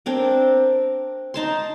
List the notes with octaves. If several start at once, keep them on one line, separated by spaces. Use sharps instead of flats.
C4 D4 A#4
D#4 A5 C6